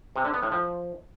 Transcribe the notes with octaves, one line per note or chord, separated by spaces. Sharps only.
C3
D3
B3
A2
F3